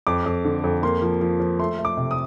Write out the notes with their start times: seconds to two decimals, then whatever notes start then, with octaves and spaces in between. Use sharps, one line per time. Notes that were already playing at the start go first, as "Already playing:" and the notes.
0.07 F2 D6
0.26 F2
0.45 D3
0.64 F2
0.83 A#3 C6
1.02 F3
1.21 F3
1.40 F3
1.59 A3 C6
1.79 A3
1.85 D6
1.97 C3
2.11 D#6